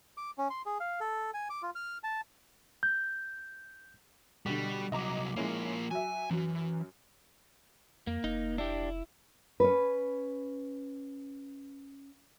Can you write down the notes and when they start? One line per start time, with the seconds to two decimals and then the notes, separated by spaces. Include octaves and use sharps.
0.17 D6
0.38 C#4
0.50 C6
0.66 G#4
0.80 F5
1.00 A4
1.34 G#5
1.50 D6
1.62 F4
1.75 F6
2.04 A5
2.83 G6
4.46 B2 D3 G3
4.92 C2 F#3 D#5 A#5 D6
5.36 F3 G#3 A#3 C#4 E4
5.91 F#3 E5 G#5
6.30 F#2 E3 F#3
8.07 F2 A#3
8.24 F1 D#4
8.58 D4 E4 G4
9.60 C#4 B4